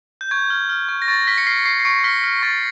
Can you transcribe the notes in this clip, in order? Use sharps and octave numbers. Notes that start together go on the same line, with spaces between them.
G6
C#6 G#6
F6
F6
C#6
A#6
C#6 A6
F6 B6
C#7
F6 C7
C#6 C7
C7
C#6 C#7
F6 B6
F6
C#6 A6